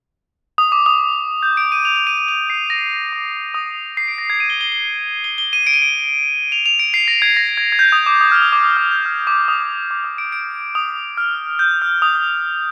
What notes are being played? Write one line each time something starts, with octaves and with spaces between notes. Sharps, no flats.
D#6
D6
D#6
G6
D7
D#7
F7
F7
D#7
D#7
F7
C7
A#6
D6
D#6
C7
D7
A#6
G#6
D#7
G7
G7
G7
G7
G7
D#7
D7
D#7
D7
F7
F7
D7
C7
A#6
G#6
A#6
G#6
G#6
G6
D#6
D6
D#6
F6
D#6
D6
D#6
F6
G6
F6
D6
D#6
D6
D#6
D7
D7
D#6
F6
G6
F6
D#6